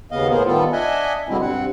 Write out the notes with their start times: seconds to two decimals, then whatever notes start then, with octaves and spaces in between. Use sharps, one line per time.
0.12 D#2 C#3 B3 D#5 F5
0.30 A2 B3 G#4 A#4 C5
0.46 D#3 G3 B3 F4 A4
0.73 D4 D#5 E5 F#5 G#5
1.29 B2 D3 G3 G#3 C4 E4
1.42 G2 C4 F#5